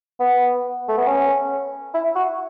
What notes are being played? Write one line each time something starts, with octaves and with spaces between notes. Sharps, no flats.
B3
A3
B3
C#4
E4
F#4